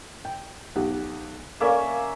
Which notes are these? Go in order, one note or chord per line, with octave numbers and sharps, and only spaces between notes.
G5
B1 G4 F#5
A#3 C#4 A4 D5 E5